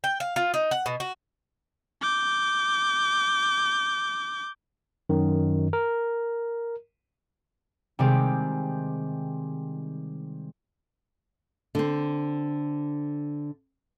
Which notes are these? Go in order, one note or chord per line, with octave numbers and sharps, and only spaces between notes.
G5
F5
F4
D#4
F#5
B2
F#4
D6 G6
F#2 D#3
A#4
C3 D#3 G3 G#3 C4 G4
D3 C4